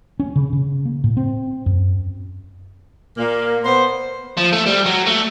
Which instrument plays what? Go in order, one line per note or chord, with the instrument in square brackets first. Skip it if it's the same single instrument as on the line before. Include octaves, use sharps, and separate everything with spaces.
[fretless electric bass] C#4
C#3
C#3
A#3
A2
C4
F#2
[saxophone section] A#2 A#3
B3 C5
[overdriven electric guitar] F3
A3
G3
F#3
A3